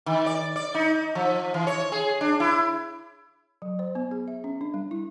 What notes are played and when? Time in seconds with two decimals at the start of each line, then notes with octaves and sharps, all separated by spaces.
0.06 D#3
0.26 D5
0.56 D5
0.74 D#4
1.15 F3
1.54 E3
1.67 C#5
1.92 G#4
2.21 D4
2.40 E4
3.62 F#3
3.79 C5
3.95 B3
4.11 G#4
4.28 E5
4.44 C#4
4.61 D4
4.74 G3
4.91 E4